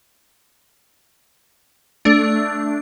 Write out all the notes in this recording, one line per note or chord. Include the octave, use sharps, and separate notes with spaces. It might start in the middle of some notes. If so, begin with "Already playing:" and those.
A3 D4